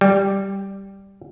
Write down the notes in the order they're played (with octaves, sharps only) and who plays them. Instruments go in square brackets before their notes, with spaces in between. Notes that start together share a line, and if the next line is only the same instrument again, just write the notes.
[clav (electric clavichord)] G3